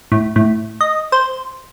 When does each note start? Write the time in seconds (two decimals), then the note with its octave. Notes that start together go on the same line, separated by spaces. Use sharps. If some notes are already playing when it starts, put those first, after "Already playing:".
0.12 A2
0.36 A2
0.81 D#5
1.12 C5